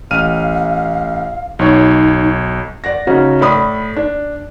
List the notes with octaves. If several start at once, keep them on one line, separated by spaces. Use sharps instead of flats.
A1 F5 F6 D#7
B1 D#4 C#5
D5 F#5 A#6
C#3 C#4 D#4 F#4
A2 D5 B5 D#6
D4